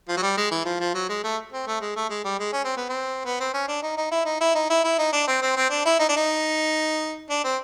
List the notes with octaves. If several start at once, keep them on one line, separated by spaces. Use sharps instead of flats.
F3
F#3
G3
G#3
E3
F3
F3
F#3
G#3
A3
C4
A3
G#3
A3
G#3
G3
G#3
C#4
C4
B3
C4
B3
C4
C#4
D4
D#4
D#4
E4
D#4
E4
D#4
E4
E4
D#4
D4
C4
C4
C4
D4
E4
D#4
D4
D#4
D4
C4